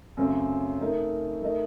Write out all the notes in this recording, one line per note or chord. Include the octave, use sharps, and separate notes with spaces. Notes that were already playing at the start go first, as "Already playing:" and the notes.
F#2 C#3 A3 C4
A3 D#4 A#4 D#5
A3 D#4 A#4 D#5